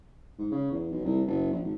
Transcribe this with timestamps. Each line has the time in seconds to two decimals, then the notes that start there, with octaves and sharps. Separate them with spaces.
0.38 G#2
0.51 C#3
0.71 E2
0.91 B1
1.04 C2
1.27 F#1
1.51 A#1
1.63 G#1